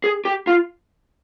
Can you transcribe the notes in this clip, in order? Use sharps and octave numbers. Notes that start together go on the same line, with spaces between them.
G#4
G4
F4